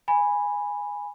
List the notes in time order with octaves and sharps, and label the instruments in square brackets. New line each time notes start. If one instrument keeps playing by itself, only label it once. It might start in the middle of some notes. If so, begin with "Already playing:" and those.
[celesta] G#5 B5